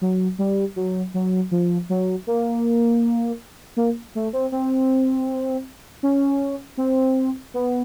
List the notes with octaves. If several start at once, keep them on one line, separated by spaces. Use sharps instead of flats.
F#3
G3
F#3
F#3
F3
F#3
A#3
A#3
A3
C4
C4
C#4
C4
B3